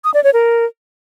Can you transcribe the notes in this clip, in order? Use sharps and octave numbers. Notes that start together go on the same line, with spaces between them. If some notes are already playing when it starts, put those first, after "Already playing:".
D#6
D5
C#5
A#4